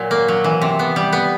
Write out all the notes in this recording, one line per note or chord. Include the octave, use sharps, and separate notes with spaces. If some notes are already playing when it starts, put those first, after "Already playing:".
Already playing: A#2 F#3
A#3
F#3
E3
C3
B3
G3
B3